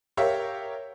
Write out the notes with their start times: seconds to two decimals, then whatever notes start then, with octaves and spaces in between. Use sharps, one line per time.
0.17 G4 A#4 C#5 E5 F5